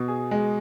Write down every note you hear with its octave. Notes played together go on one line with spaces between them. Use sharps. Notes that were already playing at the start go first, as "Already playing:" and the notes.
Already playing: B2
G#4
G#3